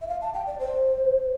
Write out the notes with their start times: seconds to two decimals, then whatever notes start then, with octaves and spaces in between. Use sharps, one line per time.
0.01 E5
0.08 F5
0.21 A5
0.34 G5
0.47 D5
0.59 C5